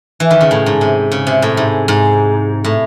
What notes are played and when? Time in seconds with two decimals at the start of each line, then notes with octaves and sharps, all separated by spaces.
0.20 E3
0.30 D#3
0.41 C#3
0.51 A2
0.66 G#2
0.81 C3
1.12 C#3
1.27 C3
1.42 A2
1.57 G#2
1.88 G#2
2.64 A2